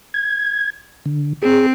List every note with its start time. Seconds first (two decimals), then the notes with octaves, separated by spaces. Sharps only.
0.14 G#6
1.06 D3
1.42 C4 G#4